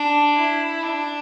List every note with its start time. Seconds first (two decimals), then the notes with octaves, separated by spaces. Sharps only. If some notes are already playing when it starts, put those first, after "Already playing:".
Already playing: D4
0.36 E4
0.83 D4